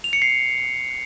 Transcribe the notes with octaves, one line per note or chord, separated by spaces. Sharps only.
F7
C#7
C7